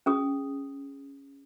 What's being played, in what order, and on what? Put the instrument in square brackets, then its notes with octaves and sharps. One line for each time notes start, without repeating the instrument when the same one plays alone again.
[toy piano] C#4 G#4 D#6